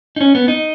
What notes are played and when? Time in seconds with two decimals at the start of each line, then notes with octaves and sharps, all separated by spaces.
0.16 D#4
0.21 C#4
0.35 B3
0.48 D#4